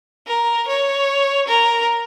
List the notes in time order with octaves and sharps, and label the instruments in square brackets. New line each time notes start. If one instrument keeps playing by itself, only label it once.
[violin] A#4
C#5
A#4